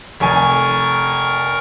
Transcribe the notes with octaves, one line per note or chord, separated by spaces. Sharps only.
F1 A#4 G#5 C#6